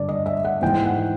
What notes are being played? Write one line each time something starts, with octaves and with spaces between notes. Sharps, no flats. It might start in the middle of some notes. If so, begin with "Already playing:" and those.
Already playing: G2 D3 D5
D#5
E5
F#5
G#2 E3 G#3 G5
F#5